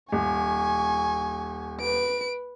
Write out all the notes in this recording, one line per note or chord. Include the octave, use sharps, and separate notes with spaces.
D#1 G#5 C#6
B4 D7